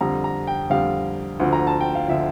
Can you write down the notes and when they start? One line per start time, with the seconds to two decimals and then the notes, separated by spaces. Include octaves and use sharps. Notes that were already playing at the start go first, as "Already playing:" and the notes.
0.01 F2 D3 G3 A#5
0.24 A#5
0.47 G5
0.70 F2 D3 G3 F5
1.40 D2 D3 F3
1.53 A#5
1.67 A5
1.81 G5
1.95 F5
2.08 D3 F3 E5